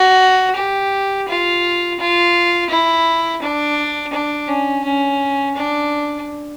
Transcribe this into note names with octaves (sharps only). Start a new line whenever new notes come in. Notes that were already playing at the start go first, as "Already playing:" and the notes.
Already playing: F#4
G4
F4
F4
E4
D4
D4
C#4
C#4
D4